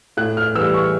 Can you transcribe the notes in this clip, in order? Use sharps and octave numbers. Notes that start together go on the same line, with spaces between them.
A2 F#6
F6
E3 G3 E6
C#6